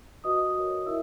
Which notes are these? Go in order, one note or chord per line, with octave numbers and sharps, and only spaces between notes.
F#4 B4 D#5 D#6
F#4 A#4 C#5
E4 A#4 E5 E6